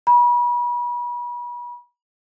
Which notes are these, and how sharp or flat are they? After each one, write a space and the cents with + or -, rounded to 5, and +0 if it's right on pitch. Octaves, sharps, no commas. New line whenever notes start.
B5 -35